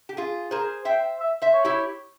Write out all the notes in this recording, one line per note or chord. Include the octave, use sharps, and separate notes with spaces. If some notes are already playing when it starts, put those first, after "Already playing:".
G4
F4 G#4
G#4 A#4 C5
C5 E5 G5
E5
C5 E5
C#5
E4 G4